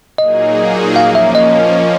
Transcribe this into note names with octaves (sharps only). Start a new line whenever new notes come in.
A#2 F#3 A#3 D#4 G#4 D#5
F3 A#3 C#4 F5
E5
D#5